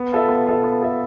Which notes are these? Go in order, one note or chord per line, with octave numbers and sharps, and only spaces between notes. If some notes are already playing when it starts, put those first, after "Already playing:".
Already playing: B3
F4 A4 E5
B3
F4 A4 E5
B3
F4 A4 E5